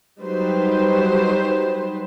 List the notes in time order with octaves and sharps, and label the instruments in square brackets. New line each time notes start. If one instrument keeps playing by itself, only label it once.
[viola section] F#3 G3 D#4 B4 C5